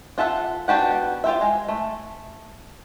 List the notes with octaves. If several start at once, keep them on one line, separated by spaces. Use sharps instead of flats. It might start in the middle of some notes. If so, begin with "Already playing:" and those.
D4 F4 A4 E5 F#5
B3 D4 F#4 G4 F#5
F4 G4 C5 E5
G#3
A3